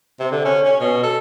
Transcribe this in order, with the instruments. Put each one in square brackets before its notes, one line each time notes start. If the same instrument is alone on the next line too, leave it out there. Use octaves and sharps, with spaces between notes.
[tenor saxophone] C3
D3
C#4
C#4
B2
A4